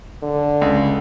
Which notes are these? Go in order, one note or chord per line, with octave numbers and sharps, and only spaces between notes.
D3
C#2